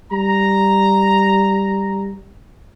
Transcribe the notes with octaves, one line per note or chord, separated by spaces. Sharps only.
G3 A#5